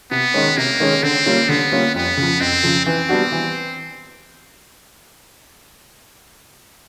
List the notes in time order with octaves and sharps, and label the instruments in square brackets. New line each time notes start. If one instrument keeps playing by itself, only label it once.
[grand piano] C3 [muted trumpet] B3
[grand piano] D#3 G#3 C#4
[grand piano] C3 [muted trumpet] A#3
[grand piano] D#3 G#3 C#4
[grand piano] D3 [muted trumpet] C4
[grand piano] G3 A#3 C#4 F4
[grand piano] D3 [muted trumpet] B3
[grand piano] G3 A#3 C#4 F4
[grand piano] F2 [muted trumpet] B3
[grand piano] C#3 F3
[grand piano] F2 [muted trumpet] C4
[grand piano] C#3 F3
[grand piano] E3 [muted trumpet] C4
[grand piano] G3 B3 D4 F#4
E3